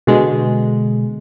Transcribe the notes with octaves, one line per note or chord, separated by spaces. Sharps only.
B2 D3 G#3